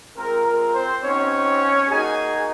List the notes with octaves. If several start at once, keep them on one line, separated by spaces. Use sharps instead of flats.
G#3 C4 F4 A#4
A#4
C4 C5
C4 C#4 D#4 F#4 C#5
A#3 D#4 F#4 G#4 G#5